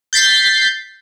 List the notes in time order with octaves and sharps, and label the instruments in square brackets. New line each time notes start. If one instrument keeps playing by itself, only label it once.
[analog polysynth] G6 A6 B6 C7